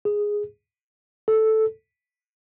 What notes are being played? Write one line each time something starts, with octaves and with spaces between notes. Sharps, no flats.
G#4
A4